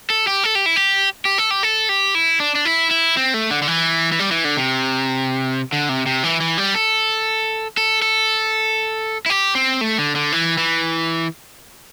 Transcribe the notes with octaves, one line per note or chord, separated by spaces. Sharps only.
A4
G4
A4
G4
E4
G4
G4
A4
G4
A4
G4
E4
D4
D4
E4
E4
C4
A3
D3
D3
E3
E3
G3
E3
D3
C3
D3
C3
C3
E3
E3
G3
A4
A4
A4
E4
G4
C4
A3
D3
D3
E3
E3